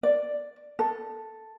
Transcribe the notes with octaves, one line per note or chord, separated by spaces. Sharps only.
D5
A4